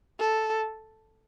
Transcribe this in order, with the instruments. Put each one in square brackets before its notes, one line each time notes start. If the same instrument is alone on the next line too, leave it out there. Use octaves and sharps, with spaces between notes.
[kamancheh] A4